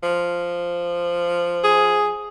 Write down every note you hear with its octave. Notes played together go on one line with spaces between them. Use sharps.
F3
G#4